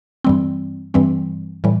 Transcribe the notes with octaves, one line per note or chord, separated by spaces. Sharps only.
G2 E3 G3 C4
G2 E3 G3 C4
A2 E3 G3